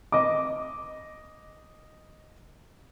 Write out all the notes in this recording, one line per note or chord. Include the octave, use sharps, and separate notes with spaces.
D#5 D6